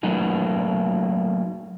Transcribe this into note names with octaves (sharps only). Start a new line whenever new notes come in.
F#3 A3 A#3 D#4 F#4